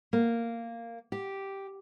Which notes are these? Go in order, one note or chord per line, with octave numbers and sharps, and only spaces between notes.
A#3
G4